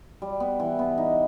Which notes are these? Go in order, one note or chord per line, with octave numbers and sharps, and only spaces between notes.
G3
B3
E3
B3
D#4